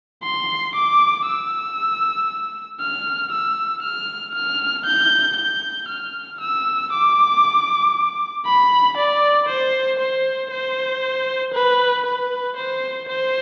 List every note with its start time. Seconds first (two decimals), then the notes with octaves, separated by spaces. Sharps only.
0.23 C6
0.75 D6
1.27 E6
2.80 F6
3.32 E6
3.83 F6
4.34 F6
4.85 G6
5.37 G6
5.88 F6
6.40 E6
6.92 D6
8.46 B5
8.97 D5
9.48 C5
9.99 C5
10.51 C5
11.53 B4
12.05 B4
12.56 C5
13.08 C5